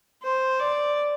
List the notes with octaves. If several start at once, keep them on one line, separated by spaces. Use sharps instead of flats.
C5
D5